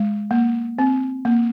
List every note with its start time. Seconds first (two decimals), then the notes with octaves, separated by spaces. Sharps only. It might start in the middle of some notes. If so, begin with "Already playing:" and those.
Already playing: G#3
0.31 A#3
0.79 C4
1.25 A#3